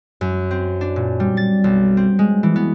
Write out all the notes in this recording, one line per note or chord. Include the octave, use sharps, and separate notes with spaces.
F#2
C4
D4
A#2
G3
A6
B1
C4
G#3
E3
B3